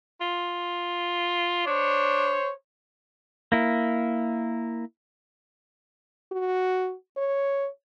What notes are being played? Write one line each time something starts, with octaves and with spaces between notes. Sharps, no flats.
F4
D4 C5 C#5
A#3 E4
F#4
C#5